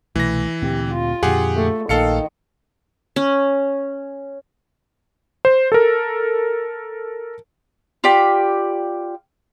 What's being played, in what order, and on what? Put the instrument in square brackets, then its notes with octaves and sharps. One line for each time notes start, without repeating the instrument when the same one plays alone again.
[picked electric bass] C2 B2 A3 [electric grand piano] E3 A#6
[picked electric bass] D2 A#2 C4 [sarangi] G4
[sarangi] F4
[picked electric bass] F2 A#2 D3 [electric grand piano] G4 G#4 F#5
[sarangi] A3
[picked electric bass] A#1 A#3 [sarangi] D#3 [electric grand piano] A4 F5 C#7
[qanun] C#4
[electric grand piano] C5
A4 A#4
[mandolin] F4 G4 D5 B5